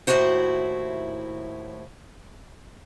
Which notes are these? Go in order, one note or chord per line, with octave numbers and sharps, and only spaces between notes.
D#2 A2 E3 E4 F#4 C5